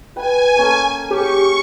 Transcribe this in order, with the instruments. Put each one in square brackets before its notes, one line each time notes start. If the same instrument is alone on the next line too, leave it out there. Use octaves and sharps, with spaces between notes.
[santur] B4 G5 [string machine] G#5
[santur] A#3 C#4 A4
[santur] C#4 G#4 [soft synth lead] G4 [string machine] C#6